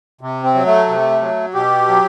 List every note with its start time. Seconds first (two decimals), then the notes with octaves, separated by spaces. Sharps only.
0.21 C3
0.44 C4
0.54 F#3
0.66 A3
0.88 C3
1.21 F#3
1.54 B2 G4
1.88 F#3